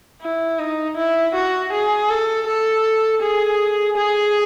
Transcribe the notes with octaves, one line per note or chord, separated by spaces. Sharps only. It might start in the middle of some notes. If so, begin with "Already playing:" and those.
E4
D#4
E4
F#4
G#4
A4
A4
G#4
G#4